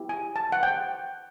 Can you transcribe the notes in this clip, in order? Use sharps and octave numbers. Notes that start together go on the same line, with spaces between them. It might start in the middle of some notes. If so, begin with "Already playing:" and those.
Already playing: B3 E4 G4
G#5
A5
F#5
G5